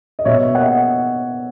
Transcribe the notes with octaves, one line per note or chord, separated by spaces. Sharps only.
D#5
B2 C#5 E5
A#3 D#5 F#5